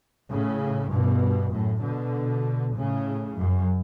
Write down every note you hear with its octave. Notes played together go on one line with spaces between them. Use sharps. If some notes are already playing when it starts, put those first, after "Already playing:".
A2 C#3
G2 B2
F#2 A2
B2 D3
A2 C#3
F#2